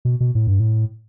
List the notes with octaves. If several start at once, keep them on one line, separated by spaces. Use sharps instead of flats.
B2
B2
A2
G2
A2